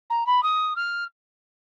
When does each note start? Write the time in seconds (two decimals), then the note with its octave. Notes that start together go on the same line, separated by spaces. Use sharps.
0.10 A#5
0.26 B5
0.43 D#6
0.76 F6